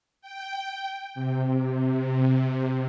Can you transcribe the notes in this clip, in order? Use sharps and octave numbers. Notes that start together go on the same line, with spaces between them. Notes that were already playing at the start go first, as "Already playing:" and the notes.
G5
C3